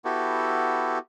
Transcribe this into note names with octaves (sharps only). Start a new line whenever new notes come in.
B3 E4 F#4 G4 A4